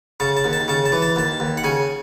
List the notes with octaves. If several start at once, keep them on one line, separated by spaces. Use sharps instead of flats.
C#3 A5
A5
D#2
A5
C#3 A5
A5
E3
A5
D#2 A5
D#2
F#5
C#3 G#5